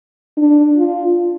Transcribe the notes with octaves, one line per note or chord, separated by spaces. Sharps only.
D4
F4